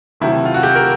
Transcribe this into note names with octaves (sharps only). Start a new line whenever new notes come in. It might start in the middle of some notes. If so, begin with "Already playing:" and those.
C3 D#3 F#3 A3 E4
F4
F#4
G4
A#4